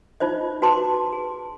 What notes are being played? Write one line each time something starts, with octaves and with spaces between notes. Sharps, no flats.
D#4 F4 C5 D#5
F#4 B4 A5 C6 D6
G#4